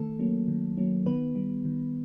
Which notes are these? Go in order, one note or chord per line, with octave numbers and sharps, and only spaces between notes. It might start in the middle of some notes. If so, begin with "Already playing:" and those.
Already playing: D#3 A3 A4
F#3 A#3 C#4
D#3
F#3 A#3 C#4
D#3 B3 B4
G3 B3
D#3